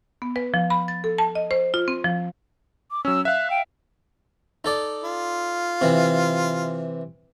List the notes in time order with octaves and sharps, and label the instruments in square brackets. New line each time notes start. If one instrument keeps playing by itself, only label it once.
[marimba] B3
B4
F3
B5
A6
A4
A5
D#5
C5
F4
C4
F3
[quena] D6
[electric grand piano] F#3 C#4 [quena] E6
[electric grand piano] E5 F5 [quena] F#6
[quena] G5
[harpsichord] D#4 A4 D5
[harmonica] F4
[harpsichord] C3 E3